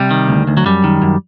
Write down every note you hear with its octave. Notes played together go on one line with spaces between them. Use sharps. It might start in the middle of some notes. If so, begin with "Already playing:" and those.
Already playing: C3 G3
D#3
D2
D2
F#3
F#2 G3
D#3
F#2